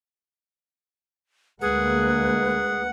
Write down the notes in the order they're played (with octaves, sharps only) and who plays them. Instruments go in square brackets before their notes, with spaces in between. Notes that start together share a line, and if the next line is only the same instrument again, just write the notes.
[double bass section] D2 G#3 A#3 [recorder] G#4 [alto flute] B4 [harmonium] F#5